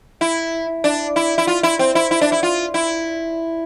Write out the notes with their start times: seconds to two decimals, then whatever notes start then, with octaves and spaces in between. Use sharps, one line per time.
0.21 E4
0.84 D4
1.16 E4
1.38 E4
1.47 F4
1.63 E4
1.79 C4
1.95 E4
2.11 E4
2.21 D4
2.32 E4
2.43 F4
2.74 E4